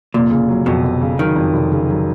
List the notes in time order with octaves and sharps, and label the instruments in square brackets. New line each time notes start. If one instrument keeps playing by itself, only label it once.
[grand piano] F1 [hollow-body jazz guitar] A#2
[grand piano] C#3
F#3
[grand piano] F2 [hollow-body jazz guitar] B2
[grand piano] F1
C#3
[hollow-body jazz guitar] D#3 [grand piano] F#3
[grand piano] F2
F1
C#3
F#3